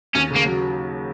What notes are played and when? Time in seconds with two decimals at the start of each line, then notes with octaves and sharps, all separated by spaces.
0.15 D#2 C#4
0.31 C#3 A#3
0.45 F#3